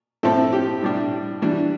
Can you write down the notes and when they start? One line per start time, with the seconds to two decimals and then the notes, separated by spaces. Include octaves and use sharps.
0.23 A2 F3 A3 C4 A4
0.52 G4
0.82 A2 G3 D4
1.42 E3 G3 D4